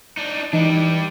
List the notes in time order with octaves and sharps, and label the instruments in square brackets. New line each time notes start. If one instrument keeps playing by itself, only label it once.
[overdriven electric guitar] D4 D#4
[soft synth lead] E3 [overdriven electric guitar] G3 D4 [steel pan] D#4